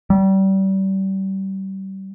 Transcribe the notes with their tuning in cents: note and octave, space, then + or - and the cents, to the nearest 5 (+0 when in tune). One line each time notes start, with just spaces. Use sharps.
G3 -30